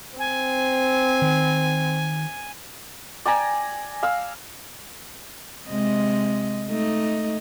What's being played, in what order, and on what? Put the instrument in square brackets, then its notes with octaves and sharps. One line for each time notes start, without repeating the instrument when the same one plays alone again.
[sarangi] C4 [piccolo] G#5
[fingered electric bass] D#3
[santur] D5 G5 G#5 A#5
F5 E6
[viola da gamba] C3 G#3 D#5
A3 D#4 D#5